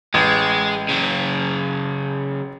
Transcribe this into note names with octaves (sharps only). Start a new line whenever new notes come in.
A1 G#3
C#3 F#3